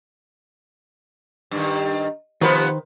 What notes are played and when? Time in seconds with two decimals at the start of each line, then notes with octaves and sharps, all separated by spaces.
1.51 G2 D#3
2.41 C3 D#3 F3 B3 B4 C5